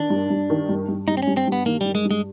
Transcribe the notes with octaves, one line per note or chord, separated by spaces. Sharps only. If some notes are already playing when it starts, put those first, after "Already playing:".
Already playing: D#3 D4
G2
G2
D#3
G2
G2
G2 D#4
C4
G2 C#4
C4
G2
B3
D#3 A#3
G2 G3
G#3
G2
G#3